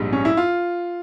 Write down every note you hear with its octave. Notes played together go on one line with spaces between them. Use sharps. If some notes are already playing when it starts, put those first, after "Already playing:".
Already playing: A#1 G#2 G3
C#4
E4
F4